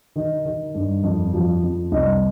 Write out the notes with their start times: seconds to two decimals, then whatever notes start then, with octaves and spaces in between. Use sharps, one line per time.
0.16 D#3
0.45 D#3
0.75 G2
1.03 F2
1.33 F3
1.63 F2
1.92 C2 D#5